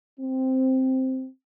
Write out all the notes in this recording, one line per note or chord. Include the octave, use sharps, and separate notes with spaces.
C4